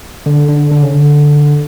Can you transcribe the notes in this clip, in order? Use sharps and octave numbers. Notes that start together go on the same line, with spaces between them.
D3
D3
D3
C#3
D3